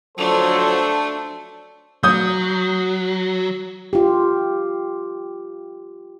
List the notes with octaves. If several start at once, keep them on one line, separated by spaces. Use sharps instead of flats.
D3 F3 F#3 A3 D4 A4 C5
F#3 D#6 G6
F4 G4